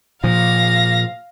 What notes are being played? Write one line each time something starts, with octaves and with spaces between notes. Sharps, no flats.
A#2 F3 F5 A#6